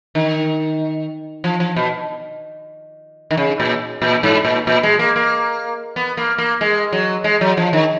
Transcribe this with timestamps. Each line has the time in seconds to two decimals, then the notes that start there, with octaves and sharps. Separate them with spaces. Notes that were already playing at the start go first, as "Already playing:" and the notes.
0.15 D#3
1.44 F3
1.60 F3
1.76 B2
3.31 D#3
3.37 C#3
3.60 A#2
4.02 A#2
4.23 G#2
4.45 A#2
4.67 A#2
4.83 G#3
4.99 A#3
5.16 A#3
5.96 B3
6.17 A#3
6.38 A#3
6.61 G#3
6.92 F#3
7.24 G#3
7.41 F#3
7.57 F3
7.73 D#3